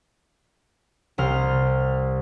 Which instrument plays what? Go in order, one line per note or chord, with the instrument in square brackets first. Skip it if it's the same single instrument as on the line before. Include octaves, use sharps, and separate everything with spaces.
[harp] C2 C5 F6